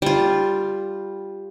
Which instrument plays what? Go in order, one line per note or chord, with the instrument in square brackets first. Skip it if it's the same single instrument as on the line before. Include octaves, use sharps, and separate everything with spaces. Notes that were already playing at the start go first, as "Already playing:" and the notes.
[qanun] G3 F4